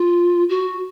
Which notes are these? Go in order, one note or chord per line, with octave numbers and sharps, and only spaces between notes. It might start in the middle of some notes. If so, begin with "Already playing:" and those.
Already playing: F4
F#4